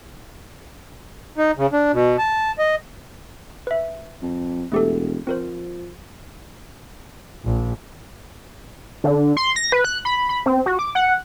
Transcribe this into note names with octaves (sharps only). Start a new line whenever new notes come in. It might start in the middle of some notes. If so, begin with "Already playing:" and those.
D#4
C#3
D4
B2
A5
D#5
B4 E5
F2
E1 A3 G4 A4
F3 C4 A#4 C5
A#1
D3
C6
A#6
B4
F#6
B5
B5
C4
F#4
D6
F#5